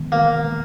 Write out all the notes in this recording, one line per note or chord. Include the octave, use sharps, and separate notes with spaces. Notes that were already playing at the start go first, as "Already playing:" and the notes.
Already playing: D#3 G#3 B3
A#3